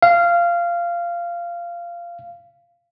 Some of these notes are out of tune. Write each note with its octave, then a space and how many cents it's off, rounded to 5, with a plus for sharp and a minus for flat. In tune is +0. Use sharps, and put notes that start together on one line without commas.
F5 -15